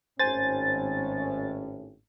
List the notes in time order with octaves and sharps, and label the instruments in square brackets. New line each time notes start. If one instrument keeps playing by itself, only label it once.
[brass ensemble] G#1 A2 C#4 [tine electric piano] C5 G#5 [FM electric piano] A6